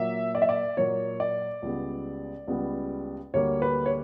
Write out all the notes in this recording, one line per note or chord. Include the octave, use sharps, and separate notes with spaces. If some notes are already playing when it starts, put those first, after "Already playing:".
Already playing: A#2 F#3 A#3 E5
D5
E5
D5
A#2 F#3 A#3 C#5
D5
C#2 C#3 G3 B3
C#2 C#3 G3 B3
D2 D3 G3 A#3 C#5
B4
C#5